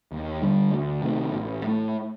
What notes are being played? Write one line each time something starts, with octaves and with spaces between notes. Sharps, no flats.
D#2
D3 G3 D4
D2
C3 D#3 A3
A1
A2 A3